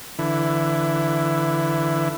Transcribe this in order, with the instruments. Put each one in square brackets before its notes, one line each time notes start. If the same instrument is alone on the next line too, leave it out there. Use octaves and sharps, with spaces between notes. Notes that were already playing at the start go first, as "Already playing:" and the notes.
[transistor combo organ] D3 E3 E4